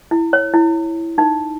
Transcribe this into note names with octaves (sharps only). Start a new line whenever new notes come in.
E4
C#5
E4
D#4